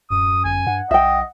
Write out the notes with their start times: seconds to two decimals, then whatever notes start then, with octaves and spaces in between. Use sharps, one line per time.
0.10 D1 F#2 D#6
0.45 G1 G#5
0.67 G2 F#5
0.91 B1 D#5 E5 G5